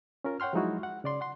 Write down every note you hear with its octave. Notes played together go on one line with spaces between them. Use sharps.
C#4 F4 A#4
C#5 F#5 G5 C6 F6
F3 F#3 G#3 D#4 E4 F#4
F#5
C#3 D5 C6
F#5 C6